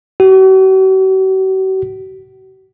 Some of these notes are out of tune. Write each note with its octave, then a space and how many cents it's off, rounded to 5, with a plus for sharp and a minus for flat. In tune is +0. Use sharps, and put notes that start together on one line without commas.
F#4 +45